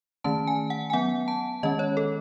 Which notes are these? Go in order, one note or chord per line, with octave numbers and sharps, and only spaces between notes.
D#3 A3 C#4 A5
G#5
F#5
G#5
F#3 B3 F#5
A5
D#3 G#3 C#4 D#5
C#5
A4